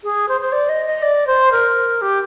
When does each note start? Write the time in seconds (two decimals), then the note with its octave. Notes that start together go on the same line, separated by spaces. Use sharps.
0.04 G#4
0.29 C5
0.41 C5
0.52 D5
0.69 D#5
0.86 D#5
1.02 D5
1.27 C5
1.52 A#4
2.02 G4